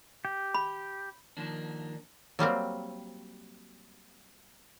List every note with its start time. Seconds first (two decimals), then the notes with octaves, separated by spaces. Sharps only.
0.25 G4
0.54 B5
1.37 D#3 F3 A#3 D4
2.39 F#3 G3 A#3 C4